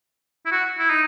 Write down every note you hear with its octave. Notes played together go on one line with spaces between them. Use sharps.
E4
F#4
E4
D#4